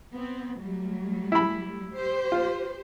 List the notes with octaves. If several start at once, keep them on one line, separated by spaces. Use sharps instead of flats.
B3 C4
F#3 G3 A3
E4 B5
G4 C5
F4